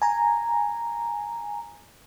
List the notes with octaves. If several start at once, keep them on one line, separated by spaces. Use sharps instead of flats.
G#5 A#5